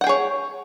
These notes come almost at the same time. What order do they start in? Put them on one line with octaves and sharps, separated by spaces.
F#5 G5 G#4 C#5